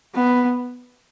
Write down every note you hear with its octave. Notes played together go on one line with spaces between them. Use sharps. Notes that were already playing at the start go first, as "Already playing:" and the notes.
B3